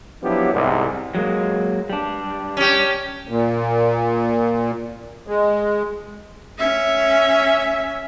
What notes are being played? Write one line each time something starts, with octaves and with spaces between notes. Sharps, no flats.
F3 F#3 B3 D4 E4 G4
C2 G#2
F#3 G#3 A#3
G3 D4
C#4 G4
A#2
G#3
C#4 E5